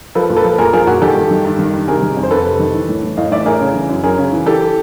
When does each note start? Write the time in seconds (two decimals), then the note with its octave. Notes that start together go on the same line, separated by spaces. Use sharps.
0.15 F3 A4 B4
0.30 A#2
0.37 A4 B4
0.44 F3
0.58 A#2 G#4 A#4
0.73 F3 G#4 A#4
0.87 A#2 F#4 G#4
1.02 D#3 G4 A4
1.16 G2
1.31 D#3
1.45 G2
1.59 D#3
1.73 G2
1.88 C3 G#4 A#4
2.02 D#3
2.17 F2
2.23 C5
2.31 F2 A4 B4
2.45 C3
2.59 D#3
2.74 E3
2.89 A2
3.03 E3
3.17 A2 D#5 F5
3.32 E3 D5 E5
3.46 A2 G#4 A#4
3.60 C#3
3.74 E3
3.89 F#2
4.03 F#2 G#4 A#4
4.18 C#3
4.32 E3
4.46 E3 G4 A4